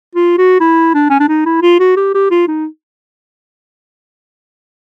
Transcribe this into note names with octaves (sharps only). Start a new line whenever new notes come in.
F4
F#4
E4
D4
C#4
D4
D#4
E4
F4
F#4
G4
G4
F4
D#4